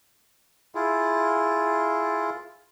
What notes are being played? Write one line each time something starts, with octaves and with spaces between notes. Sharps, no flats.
E4 F4 G#4